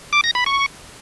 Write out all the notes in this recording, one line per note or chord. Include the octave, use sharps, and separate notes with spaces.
D6
A#6
B5
C#6